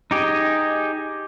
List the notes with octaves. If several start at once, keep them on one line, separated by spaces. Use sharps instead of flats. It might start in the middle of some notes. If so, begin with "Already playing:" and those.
D#4 G4 G#4